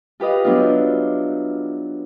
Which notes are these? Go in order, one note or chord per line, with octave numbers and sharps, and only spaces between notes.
F4 G4 B4 D#5 F5
F#3 B3 D4 E4 F4